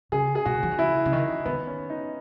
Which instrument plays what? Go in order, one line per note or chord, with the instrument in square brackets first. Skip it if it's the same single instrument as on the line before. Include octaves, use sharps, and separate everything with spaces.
[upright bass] C#3 [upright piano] G#4
[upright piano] G#4
[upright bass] B2 [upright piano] F#4
[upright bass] E3
D#3
[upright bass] C#3 [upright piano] E4
[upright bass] C#3
[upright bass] D#3 [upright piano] D#4
[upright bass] D#3 [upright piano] B3
[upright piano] C#4
D#4